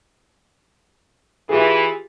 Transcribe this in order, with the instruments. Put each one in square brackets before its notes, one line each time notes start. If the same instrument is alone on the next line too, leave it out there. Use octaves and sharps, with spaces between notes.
[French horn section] E3 [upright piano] F4 G4 G#4